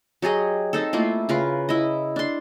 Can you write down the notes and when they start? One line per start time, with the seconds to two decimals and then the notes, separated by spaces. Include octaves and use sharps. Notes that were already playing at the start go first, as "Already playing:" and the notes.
0.22 F#3 G4 G#4 D#5
0.73 C4 D#4 A4
0.93 A3 A#3 E4 F4
1.29 C#3 F4 A#4 B4
1.69 E4 D#5
2.16 D4 C6